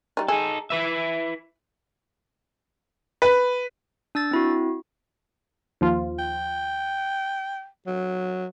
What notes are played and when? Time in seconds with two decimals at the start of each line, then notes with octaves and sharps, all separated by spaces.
0.17 G3 D#4
0.28 D#4 G#4 A4
0.70 E4 B4 E5
3.22 B4
4.15 D4 E6 A6
4.31 C4 E4 F#4
5.81 D#2 F3 F4
6.19 G5
7.87 F#3